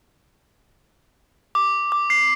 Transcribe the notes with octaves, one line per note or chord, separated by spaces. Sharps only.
D6
D6
C7